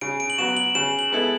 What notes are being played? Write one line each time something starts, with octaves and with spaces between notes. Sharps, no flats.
C#3 D7
D7
F#7
F#3 B3 F#4 E7
F#7
C#3 E7
F#7
G#3 B3 E4 A4